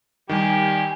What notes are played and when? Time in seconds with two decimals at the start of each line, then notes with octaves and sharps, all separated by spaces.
0.29 D#3 G3 G4 G#5